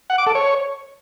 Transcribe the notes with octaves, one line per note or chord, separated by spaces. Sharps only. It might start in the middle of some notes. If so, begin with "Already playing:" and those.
F#5
D6
A4
C#5